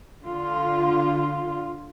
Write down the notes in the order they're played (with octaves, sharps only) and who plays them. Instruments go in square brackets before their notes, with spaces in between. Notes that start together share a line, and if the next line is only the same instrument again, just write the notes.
[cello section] D3 F4